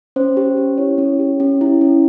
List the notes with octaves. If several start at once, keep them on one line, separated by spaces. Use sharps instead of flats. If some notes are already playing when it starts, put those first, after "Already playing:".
C#4 C5
G4
C#4
E4 C#5
C#4
G4
C#4
E4
C#4